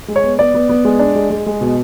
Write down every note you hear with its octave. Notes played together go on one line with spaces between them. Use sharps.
G#3
C#5
B3
B3 D5
B3
B3
G#3
D4
G#3
G#3
G#3
B2